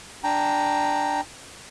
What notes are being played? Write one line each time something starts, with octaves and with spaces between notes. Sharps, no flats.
D4 G5 A#5